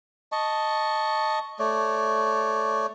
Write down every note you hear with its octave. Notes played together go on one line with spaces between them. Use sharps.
D#5 A5 C#6
A3 C#5 D5